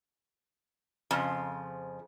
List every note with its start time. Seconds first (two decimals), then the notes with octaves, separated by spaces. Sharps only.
1.11 F2 C#3 F3